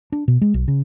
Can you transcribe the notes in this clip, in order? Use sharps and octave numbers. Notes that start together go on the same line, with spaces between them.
D4
B2
G#3
B1
C#3